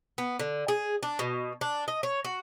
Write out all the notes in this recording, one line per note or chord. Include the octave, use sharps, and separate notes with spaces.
B3
D3
G#4
D4
B2
D4
D#5
C#5
F#4